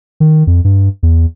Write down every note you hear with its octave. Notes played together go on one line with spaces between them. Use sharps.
D#3
F2
G2
E2